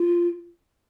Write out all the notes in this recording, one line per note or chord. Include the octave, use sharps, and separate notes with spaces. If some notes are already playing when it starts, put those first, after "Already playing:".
Already playing: F4